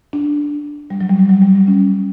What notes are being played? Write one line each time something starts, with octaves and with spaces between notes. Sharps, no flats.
D4
G3
F#3
G3
G3
F#3
G3
G3
C#4